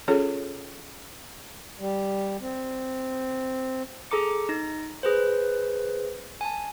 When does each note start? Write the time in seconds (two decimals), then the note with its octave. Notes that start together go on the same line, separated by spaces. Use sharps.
0.08 C#4 F4 G#4 A4 C#5
1.79 G3
2.41 C4
4.11 G#4 A4 A#5 D6 C#7
4.49 D#4 A#6
5.03 G#4 B4 C5
6.41 G#5 A5